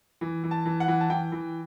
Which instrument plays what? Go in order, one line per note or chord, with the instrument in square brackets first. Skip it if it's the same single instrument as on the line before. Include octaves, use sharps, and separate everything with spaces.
[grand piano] E3
E3
A5
E3
F#5
E3
A5
E3 G5
E3